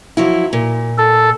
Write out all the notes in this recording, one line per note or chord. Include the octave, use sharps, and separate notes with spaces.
F3 F#3 E4
A#2
A4